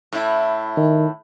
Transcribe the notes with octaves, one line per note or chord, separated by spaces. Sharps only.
A2 E4
D#3